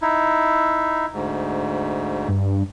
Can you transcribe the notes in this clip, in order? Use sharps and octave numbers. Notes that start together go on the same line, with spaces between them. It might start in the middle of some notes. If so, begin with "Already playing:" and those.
D#4 E4
D2 G#2
G2